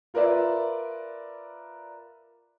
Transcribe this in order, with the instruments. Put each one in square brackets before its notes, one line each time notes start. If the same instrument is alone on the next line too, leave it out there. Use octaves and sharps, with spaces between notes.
[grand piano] F4 A#4 B4 D5 E5